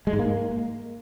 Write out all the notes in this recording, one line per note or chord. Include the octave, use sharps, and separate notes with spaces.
G#3
G#2
A#3